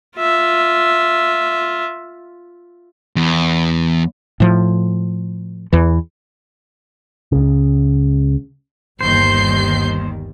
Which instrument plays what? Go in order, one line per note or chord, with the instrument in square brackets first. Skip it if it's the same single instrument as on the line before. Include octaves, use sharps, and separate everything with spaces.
[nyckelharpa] F4 E5
[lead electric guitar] E2
[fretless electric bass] A2 F3
E2 E3
[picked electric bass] C#2 C#3
[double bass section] G1 G3 [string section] D#2 D#3 [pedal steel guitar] C5 [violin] G6 C7